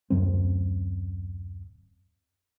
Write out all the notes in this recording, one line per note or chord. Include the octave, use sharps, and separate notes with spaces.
D1 F#2 F#3 C4